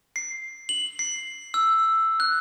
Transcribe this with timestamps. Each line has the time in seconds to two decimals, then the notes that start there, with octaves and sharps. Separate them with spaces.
0.16 C7
0.69 F#7
0.99 C7
1.54 E6
2.20 F#6